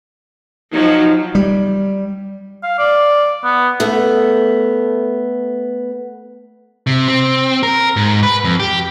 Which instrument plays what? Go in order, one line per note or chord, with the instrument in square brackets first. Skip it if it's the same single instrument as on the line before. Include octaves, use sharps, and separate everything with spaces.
[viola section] F3 F#3 [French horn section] D#4
[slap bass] G3
[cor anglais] F5
D5
B3
[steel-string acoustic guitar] A3 B3
[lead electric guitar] C3
C4
A#4
G#2
B4
F2
G4